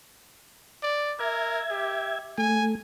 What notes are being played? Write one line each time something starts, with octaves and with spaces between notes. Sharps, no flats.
D5
A#4 E5 G#6
G4
A3 G#5